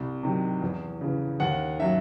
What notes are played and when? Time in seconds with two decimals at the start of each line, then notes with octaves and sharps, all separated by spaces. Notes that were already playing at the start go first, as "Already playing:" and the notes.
Already playing: C2
0.23 C3 D#3 F#3
0.62 E2
1.01 C#3 E3
1.40 D#2 F#5
1.79 D#3 F#3 E5